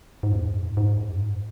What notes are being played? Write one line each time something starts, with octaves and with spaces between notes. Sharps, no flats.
G#2
E2
F#2
A2
G#2
G#2
F#2
G#2